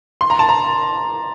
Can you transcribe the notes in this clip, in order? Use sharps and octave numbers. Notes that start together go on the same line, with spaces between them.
C6
A#5
A5
A#5